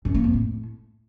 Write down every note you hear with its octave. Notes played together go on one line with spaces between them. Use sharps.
F#2
A#3
F2
A2